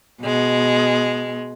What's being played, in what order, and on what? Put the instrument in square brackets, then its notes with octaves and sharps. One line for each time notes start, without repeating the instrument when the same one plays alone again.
[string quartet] B2 G#3